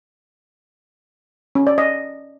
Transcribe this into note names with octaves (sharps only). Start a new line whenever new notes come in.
C#4
D5
D#5